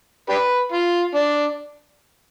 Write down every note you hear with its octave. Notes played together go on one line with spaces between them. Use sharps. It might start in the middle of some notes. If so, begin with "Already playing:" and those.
D4 G4 B4
F4
D4